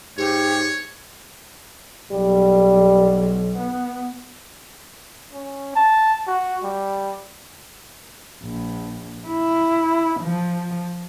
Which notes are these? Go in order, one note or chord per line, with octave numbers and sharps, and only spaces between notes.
G#2 G4 C#5
B1 G3
B3
C#4
A5
F#4
G3
A#1
E4
F3